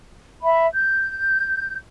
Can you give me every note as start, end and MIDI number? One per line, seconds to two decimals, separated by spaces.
0.42 0.66 76
0.42 0.66 83
0.73 1.76 91